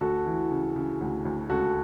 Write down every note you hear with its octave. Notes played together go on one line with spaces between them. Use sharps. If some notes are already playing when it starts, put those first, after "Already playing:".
D2 F#4 A4
E3
C#3
C#3
D2
D2
C#2 F#4 A4